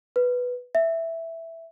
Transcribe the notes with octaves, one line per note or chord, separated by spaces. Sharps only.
B4
E5